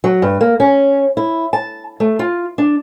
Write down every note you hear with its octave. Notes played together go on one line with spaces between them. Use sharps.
F#3
G2
A#3
C#4
E4
A5
A3
F4
D4